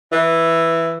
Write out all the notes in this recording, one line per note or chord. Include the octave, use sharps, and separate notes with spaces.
E3